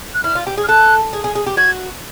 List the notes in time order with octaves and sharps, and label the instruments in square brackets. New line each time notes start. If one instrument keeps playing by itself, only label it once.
[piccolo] F#6
[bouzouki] E4 [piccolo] F6
[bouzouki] F4
G4
G#4
[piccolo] F6
[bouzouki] A4 [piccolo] F#6
[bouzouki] G#4
G#4
G#4
G4
[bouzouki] F#4 [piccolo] G#6